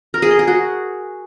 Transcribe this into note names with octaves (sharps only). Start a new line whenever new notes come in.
A#4
G#4
D#5
G#4
F#4